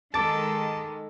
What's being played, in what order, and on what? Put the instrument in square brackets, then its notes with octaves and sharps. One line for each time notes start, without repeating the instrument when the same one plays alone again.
[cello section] D#3 G#3 [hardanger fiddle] A4 [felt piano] A5 [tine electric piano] D6 A6